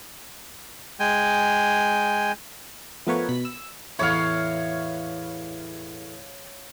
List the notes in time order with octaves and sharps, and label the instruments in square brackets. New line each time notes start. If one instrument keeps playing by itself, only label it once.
[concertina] G#3 G5 G#5
[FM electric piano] F3 A3 B3 A#4 B4 C#5
B2 B5 B6
E6
[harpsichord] E2 A2 E4 [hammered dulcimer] C#5 F5